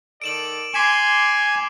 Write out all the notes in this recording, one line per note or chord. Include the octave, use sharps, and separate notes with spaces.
D#3 A4 D5 D7 E7 F#7
G#5 C6 D6 B6 E7